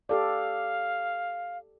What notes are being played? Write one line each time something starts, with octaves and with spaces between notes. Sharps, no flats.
G4 A4 D5 F5